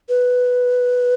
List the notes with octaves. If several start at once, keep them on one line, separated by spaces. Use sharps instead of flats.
B4